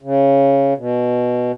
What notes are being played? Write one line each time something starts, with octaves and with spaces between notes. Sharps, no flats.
C#3
B2